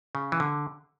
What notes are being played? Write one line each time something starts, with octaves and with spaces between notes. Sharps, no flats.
C#3
E3
D3